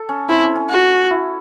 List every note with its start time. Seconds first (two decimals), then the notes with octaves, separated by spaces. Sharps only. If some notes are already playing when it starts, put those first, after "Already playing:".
Already playing: A4 A5
0.09 C#4
0.29 C4 E4
0.43 C#4
0.55 C#4
0.69 F#4
1.10 E4